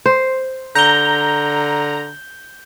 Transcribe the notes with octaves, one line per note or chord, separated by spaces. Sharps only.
C5
D3 A#5 G6 G7